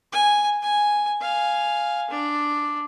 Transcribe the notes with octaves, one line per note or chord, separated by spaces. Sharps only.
G#5
G#5
F5 G#5
D4